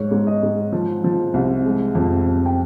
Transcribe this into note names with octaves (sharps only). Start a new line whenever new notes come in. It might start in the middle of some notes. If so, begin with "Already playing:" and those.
Already playing: G#2 C#5
G#2
D#5
G#2
F3
F3
C2
G#3
F2
F2
G5